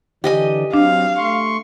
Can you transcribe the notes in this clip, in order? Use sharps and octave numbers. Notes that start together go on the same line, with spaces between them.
D3 E3 D4 G4 D#5 G#5
F#3 C4 D4 F5
A3 C6 C#6